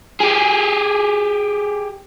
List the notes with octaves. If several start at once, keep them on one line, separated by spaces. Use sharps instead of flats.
G4 G#4